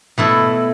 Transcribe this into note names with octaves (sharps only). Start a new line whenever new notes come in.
B2 A3 E4